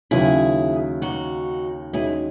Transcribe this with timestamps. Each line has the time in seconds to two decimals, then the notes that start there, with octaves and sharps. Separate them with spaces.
0.11 D#2 C#3 F#3 E4 G#4
1.02 D#4 F#4
1.93 D#2 D#3 G#3 C#4 E4 F#4 G#4